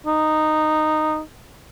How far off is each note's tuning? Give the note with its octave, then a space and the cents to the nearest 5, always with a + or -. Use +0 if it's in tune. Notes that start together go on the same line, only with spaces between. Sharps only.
D#4 -10